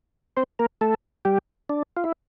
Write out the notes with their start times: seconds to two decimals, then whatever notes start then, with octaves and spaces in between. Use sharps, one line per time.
0.37 C4 C5
0.59 A#3 A#4
0.81 A3 A4
1.25 G3 G4
1.69 D4
1.97 F4
2.04 E4